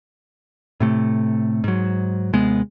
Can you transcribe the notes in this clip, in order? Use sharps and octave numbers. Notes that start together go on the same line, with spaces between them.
A2 C3 A3
G#2 F#3
D#2 C3 G#3 B3